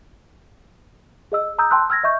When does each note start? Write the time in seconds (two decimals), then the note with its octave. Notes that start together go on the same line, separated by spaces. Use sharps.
1.32 G#4 D#5 E6
1.59 A#5 D#6 E6 G6
1.71 G5 A5 C6 E6 F#6
1.90 E6 F6 G#6 A#6
2.03 D#5 E5 C#6 G6